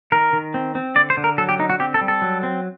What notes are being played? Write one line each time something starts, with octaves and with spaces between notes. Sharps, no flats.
D#3 A#4
D#3
C4
C4
D3 D5
C5
D3
A#4
F#3 A4
G4
D3 D#4
F#4
C4 G4
A4
G3
A4
F#3
C4